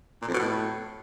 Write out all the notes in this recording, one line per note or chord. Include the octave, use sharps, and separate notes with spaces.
A#2
F2
B2
A2